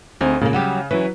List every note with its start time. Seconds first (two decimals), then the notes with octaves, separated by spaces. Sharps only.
0.21 D2 C4 D#4 G#4
0.41 A#2 C#3 A#3
0.53 F#3 G3 G4
0.91 E3 F#3 C#4 B4